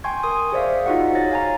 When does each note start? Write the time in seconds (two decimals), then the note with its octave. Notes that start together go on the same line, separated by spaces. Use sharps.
0.04 G5 G#5 C6 C#6 G#6
0.23 A#4 C6 D#6
0.52 G#4 C5 D5 E5 F5
0.86 D#4 F4 F#4 G#4 F#5
1.15 C#5 A6 A#6
1.31 F5 G#5 A#5